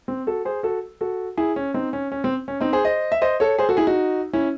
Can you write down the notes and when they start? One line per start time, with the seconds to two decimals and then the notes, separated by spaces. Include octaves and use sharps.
0.08 C4
0.27 F#4 A4
0.45 G#4 C5
0.63 F#4 A4
1.01 F#4 A4
1.37 E4 G#4
1.56 C#4
1.74 C4 D#4
1.93 C#4
2.12 C#4
2.24 C4
2.48 C#4
2.60 C4 D#4
2.73 G#4 C5
2.85 C5 D#5
3.12 E5
3.22 C5 D#5
3.40 A4 C#5
3.58 G#4 C5
3.69 F#4 A4
3.77 E4 G#4
3.87 D#4 F#4
4.33 C#4 E4